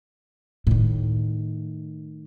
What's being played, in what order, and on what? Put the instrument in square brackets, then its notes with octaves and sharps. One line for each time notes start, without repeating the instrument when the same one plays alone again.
[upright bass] A2 D#3